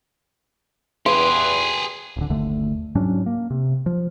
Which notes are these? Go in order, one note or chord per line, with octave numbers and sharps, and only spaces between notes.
E2 G4 G#4 B4 C6
D1 D3
G1 D#2 D3 A3
G#2 F#3 C#4 D4
A#3
C3
F3